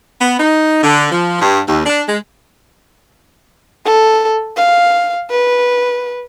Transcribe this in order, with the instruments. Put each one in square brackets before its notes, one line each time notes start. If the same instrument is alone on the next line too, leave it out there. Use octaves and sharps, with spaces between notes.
[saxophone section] B3
D#4
D3
F3
G2
D#2
D4
G#3
[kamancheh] A4
F5
B4